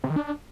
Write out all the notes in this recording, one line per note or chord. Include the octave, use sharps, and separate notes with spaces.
C3
D#3
D4